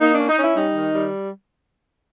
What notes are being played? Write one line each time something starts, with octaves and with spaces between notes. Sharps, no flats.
A#3 D#4
C#4 D4
D#4
C#4
E4
G3 D#4
D#3
G3